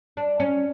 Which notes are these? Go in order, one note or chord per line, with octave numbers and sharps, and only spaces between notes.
D4
C#4